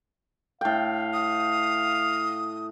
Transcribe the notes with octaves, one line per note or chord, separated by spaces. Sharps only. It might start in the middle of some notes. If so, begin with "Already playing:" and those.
A2 F5 G5
D#6